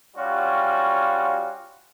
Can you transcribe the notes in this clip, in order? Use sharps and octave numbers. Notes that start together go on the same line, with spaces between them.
G3 C#4 F4 F#4